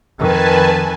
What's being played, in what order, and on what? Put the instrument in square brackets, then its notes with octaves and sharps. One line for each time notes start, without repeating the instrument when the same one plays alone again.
[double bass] F2 D#3 [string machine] B4 G#5 A5